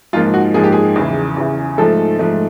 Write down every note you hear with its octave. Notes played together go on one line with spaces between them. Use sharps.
G#2 F3 A#3 F4
F#4
G#2 F3 A#3 G#4
G4
G#4
E2 C#3 E3
E2 C#3 E3
G#2 F3 A3 A4
G#2 F3 A3